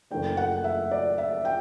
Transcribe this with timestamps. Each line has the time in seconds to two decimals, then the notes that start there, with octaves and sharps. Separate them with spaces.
0.11 F#1 F#2 E3 A3 D4 G5
0.37 F#5
0.64 E5
0.91 D5
1.18 E5
1.45 G5